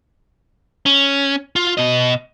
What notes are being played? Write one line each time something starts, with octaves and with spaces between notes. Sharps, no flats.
C#4
F4
B2 D#5